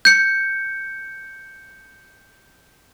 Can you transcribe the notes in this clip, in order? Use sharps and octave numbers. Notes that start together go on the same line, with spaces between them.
G6 C#7